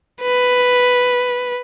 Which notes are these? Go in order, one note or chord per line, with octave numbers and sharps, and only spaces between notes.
B4